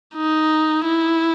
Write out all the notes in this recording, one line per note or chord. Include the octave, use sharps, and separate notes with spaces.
D#4
E4